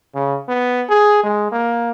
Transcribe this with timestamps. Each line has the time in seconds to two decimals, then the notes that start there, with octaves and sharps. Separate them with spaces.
0.15 C#3
0.48 B3
0.89 G#4
1.23 G#3
1.52 A#3